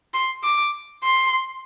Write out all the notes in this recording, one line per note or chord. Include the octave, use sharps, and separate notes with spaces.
C6
D6
C6